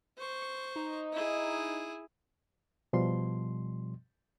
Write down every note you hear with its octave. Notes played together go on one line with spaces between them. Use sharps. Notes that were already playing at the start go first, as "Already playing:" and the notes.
C5 C#6
D#4
E4 G#4
B2 F3 G3 C6